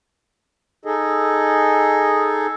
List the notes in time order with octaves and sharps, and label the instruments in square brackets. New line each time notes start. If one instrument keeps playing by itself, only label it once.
[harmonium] D#4 G#4 A4 D#5